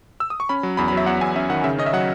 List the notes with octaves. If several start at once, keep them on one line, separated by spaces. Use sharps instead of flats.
E6
D#6
C#6
C#4 B5
F#3
E2 B5
B5
F#3 E5
E2 F#5
E2 G#5
C#4 E5
D#3 F#5
C#3 E5
C#4 D#5
E5
F#3 F#5